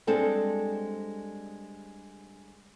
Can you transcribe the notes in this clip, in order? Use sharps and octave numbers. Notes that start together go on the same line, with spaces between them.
G3 G#3 C4 D4 A4